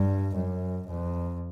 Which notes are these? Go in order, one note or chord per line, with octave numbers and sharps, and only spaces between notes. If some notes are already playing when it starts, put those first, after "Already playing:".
Already playing: G2
F#2
F2